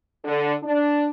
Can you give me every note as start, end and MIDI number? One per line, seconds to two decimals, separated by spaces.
0.25 0.53 50
0.63 1.07 62